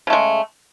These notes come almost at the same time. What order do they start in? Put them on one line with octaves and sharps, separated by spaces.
C#3 A3 G#3